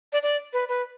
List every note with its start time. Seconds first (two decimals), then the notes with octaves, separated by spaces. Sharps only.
0.13 D5
0.23 D5
0.53 B4
0.68 B4